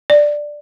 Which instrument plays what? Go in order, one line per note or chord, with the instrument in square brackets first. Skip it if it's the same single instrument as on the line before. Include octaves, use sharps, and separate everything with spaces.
[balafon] D5